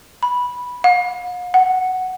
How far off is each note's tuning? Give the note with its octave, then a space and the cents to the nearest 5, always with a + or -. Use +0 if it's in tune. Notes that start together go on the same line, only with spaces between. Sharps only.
B5 -10
F5 +45
F#5 +5